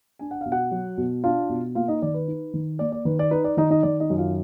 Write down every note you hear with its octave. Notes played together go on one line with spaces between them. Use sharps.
D4 G#5
F#5
B2 F5
F#4 F#5
F#3
B2
D4 F4 F5
B2
A#3 F4 F5
D#4 D#5
D#3 D5
B4
D#4
D#3
A#3 D5
D5
D#3 B4
D5
D#4 B4
D5
D#3 D#4 D#5
D#4 D#5
D#3 D5
D#4 D#5
F#2
F4 F5